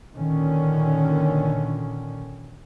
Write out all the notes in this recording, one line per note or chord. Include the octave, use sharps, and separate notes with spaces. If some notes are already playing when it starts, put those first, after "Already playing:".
A#2 D3 D#3 C#4